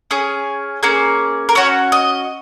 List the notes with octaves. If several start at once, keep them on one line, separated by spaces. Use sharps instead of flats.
C#4 G#4
A#3 C#4 G#4
A#4
C#4 F#4 C#5
D#5